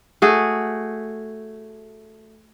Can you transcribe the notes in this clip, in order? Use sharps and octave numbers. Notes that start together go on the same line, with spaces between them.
A3 F#4 G#4